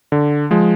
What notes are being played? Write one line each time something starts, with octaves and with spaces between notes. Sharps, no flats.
D3
F3 G#3